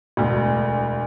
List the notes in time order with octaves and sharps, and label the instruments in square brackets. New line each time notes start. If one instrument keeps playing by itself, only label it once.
[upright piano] E1 D2